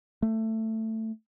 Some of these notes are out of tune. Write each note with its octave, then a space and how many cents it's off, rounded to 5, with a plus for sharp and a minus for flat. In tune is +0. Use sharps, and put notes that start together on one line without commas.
A3 +15